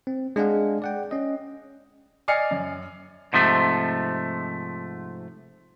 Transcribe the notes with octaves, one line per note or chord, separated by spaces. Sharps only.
C4
G#3 D4 G#4 F5 F#5
D5 F#5 G5
C#4 D#5
D5 D#5 G#5 F6 C7 C#7
F#2
G#2 C3 F3 A3